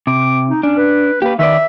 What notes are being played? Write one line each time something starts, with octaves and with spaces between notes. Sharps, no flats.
C3 D6
D#4
C#4 D4
B4
A#3 G4 B4
D#3 B4 D5 E5